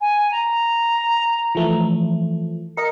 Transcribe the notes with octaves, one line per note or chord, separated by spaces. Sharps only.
G#5
A#5
E3 F3 A3
A#4 D#5 C#7